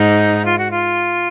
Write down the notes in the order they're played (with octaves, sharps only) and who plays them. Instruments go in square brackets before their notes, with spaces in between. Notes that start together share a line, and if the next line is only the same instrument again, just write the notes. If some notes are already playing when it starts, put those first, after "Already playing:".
Already playing: [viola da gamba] G#2 [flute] D#4
[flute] F4
F#4
F4